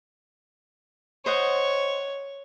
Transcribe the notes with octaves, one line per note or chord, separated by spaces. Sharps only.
C5 C#5 D#5 F#5